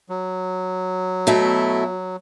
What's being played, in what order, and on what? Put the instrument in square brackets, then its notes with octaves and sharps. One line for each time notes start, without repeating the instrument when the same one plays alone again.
[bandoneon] F#3
[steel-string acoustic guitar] B2 A3 E4